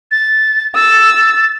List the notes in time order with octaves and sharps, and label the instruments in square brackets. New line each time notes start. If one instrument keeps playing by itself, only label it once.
[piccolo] A6
[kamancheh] E6 [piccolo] A6